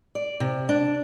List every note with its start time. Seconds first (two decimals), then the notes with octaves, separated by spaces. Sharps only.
0.15 D5
0.40 C3
0.69 D4